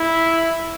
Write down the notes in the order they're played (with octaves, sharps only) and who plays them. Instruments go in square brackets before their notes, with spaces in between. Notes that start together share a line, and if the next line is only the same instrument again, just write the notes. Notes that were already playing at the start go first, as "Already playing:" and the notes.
Already playing: [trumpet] E4